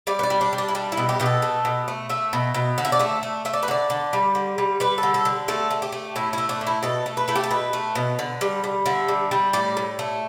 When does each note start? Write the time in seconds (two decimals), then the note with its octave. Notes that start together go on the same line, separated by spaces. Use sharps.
0.07 G3 D5
0.19 B4
0.23 D5
0.30 G3
0.41 D4
0.53 G3
0.58 D4
0.68 E4
0.75 G3 D4
0.92 E4
0.97 B2
1.09 G4
1.20 B2 G4
1.26 A4
1.42 A3
1.65 B2
1.88 A3
2.09 A3 E5
2.33 B2
2.54 B2
2.78 D3
2.85 E5
2.92 D5
2.99 A3 E5
3.23 A3
3.45 A3 E5
3.53 D5
3.63 B4
3.68 D3 D5
3.90 D3
4.13 G3
4.35 D3
4.58 G3
4.80 G3 B4
4.98 A4
5.03 D3
5.14 A4
5.25 D3
5.48 A3 A4
5.71 A3
5.82 G4
5.92 A3
6.16 A2 E4
6.33 A3 E4
6.49 D4
6.61 A2
6.67 E4
6.83 B2 A4
7.06 A3
7.17 B4
7.28 A3 E4
7.36 G4
7.44 A4
7.51 B2 B4
7.73 A3
7.95 B2
8.19 D3
8.41 G3
8.64 G3
8.86 D3 E5
9.08 G3
9.31 G3
9.53 A2 D5
9.77 A2
9.99 A3